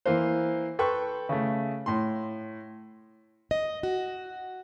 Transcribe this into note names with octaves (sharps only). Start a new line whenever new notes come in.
E3 A#3 C5
A4 B4 G5 C6 C#6
C#3 A3
A2 C6
D#5
F#4